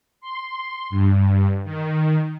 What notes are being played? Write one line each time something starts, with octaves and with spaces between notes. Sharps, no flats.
C6
G2
D#3